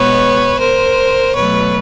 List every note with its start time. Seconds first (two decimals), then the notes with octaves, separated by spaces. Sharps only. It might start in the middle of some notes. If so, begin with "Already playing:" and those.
Already playing: B2 G#3 B3 B4 C#5
0.59 A#4 C5
1.34 B2 F#3 A3 B4 C#5